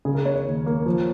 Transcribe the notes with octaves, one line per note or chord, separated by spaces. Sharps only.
C#3 G#4
A#4
C#4 C#5
C#5
D#2
A#3
F3